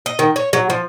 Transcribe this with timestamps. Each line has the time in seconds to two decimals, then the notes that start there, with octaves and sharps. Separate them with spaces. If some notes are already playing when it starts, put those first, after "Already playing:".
0.06 D#5
0.19 D#3
0.36 C#5
0.53 F#3
0.70 F3